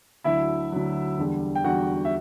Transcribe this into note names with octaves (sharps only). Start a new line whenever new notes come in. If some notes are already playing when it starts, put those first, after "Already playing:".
D2 D3 F#3 E4 E5
D2 D3 F#3
E2 D3 G3
G5
E2 D3 G3 F#4 F#5
E5